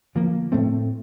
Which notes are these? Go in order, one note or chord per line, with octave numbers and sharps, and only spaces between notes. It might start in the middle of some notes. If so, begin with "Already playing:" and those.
D3 F3 A#3
A2 A3 C4